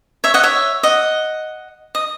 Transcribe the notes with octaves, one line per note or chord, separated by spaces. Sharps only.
C#5 E5
D#5 F#5
C#5 E5
D#5 F#5
D#5